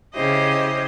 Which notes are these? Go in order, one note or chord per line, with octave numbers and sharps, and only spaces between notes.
C#3 E4 G4 C5 D#5